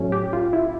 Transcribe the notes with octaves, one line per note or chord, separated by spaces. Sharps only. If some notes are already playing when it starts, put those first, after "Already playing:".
Already playing: A2 F#3 A3 C#4
G4
F4
E4